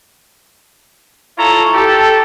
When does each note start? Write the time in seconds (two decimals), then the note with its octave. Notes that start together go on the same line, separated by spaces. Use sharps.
1.38 E4 F4 A4 C#5 A#5
1.74 G4 A4